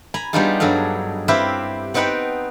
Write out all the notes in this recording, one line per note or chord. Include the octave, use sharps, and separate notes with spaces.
G#5 A#5 B5
G3 B3 D4 D#4 F4 G#4
G2 F#3 G#4 A4 F5
C4 E4 G4 B4 E5 F5
B3 C4 D#4 B4 F#5 G5